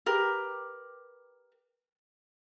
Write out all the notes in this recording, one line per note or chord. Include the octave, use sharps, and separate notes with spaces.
G4 A#4 B4